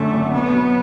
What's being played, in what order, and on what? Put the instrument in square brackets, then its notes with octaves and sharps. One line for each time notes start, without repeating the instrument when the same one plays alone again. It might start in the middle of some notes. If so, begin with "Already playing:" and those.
Already playing: [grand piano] F#2 D3 [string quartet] A3
[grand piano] G#1
[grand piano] B2 [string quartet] B3
[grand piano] F#3